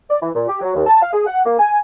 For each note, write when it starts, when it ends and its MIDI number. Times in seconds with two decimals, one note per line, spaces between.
0.09 0.18 74
0.21 0.30 52
0.34 0.48 46
0.48 0.57 67
0.61 0.75 54
0.75 0.85 39
0.87 0.99 81
1.02 1.10 77
1.13 1.22 68
1.26 1.43 78
1.45 1.56 58
1.59 1.79 80